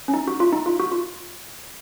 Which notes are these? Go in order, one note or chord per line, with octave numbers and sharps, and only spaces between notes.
C#4
D#4
F#4
F4
D#4
F4
F#4
F4